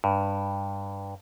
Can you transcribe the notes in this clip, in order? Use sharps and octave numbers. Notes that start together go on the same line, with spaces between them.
G2